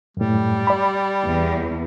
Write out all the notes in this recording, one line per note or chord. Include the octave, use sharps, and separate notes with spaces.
F#2 A2 G3
D5 B5
E2